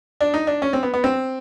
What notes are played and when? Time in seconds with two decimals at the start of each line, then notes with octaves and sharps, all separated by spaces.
0.21 D4
0.34 D#4
0.47 D4
0.62 C#4
0.73 C4
0.83 B3
0.94 B3
1.04 C4